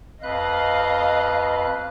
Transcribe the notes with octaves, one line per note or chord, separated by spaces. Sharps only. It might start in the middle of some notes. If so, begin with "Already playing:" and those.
F2 B4 D#5 F5 F#6